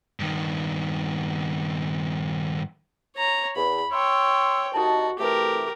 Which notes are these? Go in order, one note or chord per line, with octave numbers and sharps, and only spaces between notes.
G2 D#3
C#5 A#5
E2 B5
C#5 G5 C6 C#6 E6
C2 D#4 F#4 A5
C3 E3 A3 G4 A#4